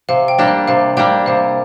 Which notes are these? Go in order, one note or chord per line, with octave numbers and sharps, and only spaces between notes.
C3 F5
G5
G3 A#3 D4 G4
F5
C3 F5
G3 A#3 D4 G4 G5
C3 F5